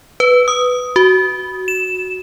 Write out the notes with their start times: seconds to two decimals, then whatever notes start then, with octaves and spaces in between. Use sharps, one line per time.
0.20 B4
0.48 D#6
0.96 F#4
1.68 E7